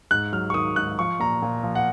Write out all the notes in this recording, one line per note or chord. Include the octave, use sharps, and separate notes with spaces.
G#2 F#6
F#3 F6
C#6
D#3 D#6
G#2 F#6
F3 C#6
A#2 A#5
A#2
F3
F#5